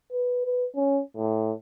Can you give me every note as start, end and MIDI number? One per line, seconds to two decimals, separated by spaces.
0.12 0.41 71
0.45 0.66 71
0.76 1.00 61
1.17 1.52 45